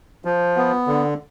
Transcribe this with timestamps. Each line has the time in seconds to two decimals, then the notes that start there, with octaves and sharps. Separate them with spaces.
0.25 F3
0.56 B3
0.87 D3